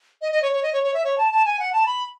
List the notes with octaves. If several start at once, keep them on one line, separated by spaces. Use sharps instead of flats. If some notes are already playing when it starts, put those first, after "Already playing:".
D#5
D#5
C#5
C#5
D#5
C#5
C#5
E5
C#5
A5
A5
G#5
F#5
A5
B5